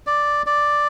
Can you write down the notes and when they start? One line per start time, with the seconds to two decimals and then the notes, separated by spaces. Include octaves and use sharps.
0.07 D5
0.46 D5